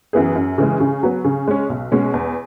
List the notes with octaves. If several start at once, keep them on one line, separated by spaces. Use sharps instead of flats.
F#2 E3 B3 G#4
F#2
C#3 E3 G#3
C#3
F#3 B3
C#3
G#3 C#4
B1
B2 G#3 C#4
E2